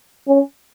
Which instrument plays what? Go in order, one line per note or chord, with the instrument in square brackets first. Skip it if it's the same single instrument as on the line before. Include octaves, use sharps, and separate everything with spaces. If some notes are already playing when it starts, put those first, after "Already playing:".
[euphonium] C#4